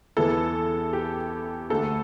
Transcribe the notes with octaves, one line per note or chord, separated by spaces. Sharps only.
E2 E3 B3 E4 A4
G4
D2 D3 A3 A4